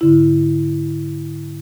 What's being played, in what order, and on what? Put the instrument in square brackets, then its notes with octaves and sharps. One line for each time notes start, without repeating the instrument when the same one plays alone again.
[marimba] G#2 D3 E4